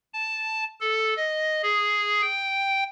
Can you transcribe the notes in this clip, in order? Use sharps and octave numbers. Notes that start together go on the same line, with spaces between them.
A5
A4
D#5
G#4
G5